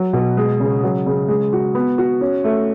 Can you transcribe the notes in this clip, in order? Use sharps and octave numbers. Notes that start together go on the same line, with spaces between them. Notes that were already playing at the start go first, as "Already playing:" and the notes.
Already playing: F#3
B2
G#3
C#3
F#3
C#3
G#3
F#4
B3
F#4
C#4
A3